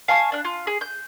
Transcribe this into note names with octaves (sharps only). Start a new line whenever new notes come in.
F5 G#5 A5 C#6
D4 F#6
F4
G#4
G6